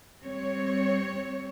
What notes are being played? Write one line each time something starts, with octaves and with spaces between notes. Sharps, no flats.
G3 C4 C#5